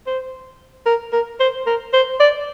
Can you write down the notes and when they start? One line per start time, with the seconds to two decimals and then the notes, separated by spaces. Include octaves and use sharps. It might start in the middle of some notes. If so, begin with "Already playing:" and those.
0.07 C5
0.86 A#4
1.13 A#4
1.40 C5
1.67 A#4
1.93 C5
2.20 D5